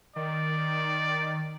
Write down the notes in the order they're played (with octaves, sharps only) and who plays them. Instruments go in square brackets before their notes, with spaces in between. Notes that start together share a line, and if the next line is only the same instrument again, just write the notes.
[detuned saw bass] D#3 [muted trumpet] D5